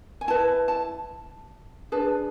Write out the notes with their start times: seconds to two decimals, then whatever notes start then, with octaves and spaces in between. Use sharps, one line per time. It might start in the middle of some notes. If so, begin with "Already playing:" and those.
0.21 G#5
0.28 E4 B4 A5
0.68 A5
1.92 D4 G#4 B4 A5